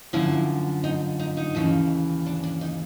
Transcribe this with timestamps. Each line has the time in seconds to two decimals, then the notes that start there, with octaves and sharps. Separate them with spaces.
0.13 F#2 D3 F3 E4
0.84 D#4
1.19 D#4
1.37 D#4
1.55 D#2 C#3 E3
2.26 D4
2.43 D4
2.61 D#4